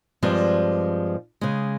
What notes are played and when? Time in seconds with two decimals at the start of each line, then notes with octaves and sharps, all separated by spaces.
0.22 G2 F3 G3 G#3 C4 D4
1.41 C#3 G#3